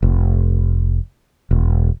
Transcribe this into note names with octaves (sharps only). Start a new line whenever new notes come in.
F1
E1